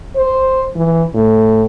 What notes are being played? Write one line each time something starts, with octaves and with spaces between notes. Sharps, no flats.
C5
E3
A2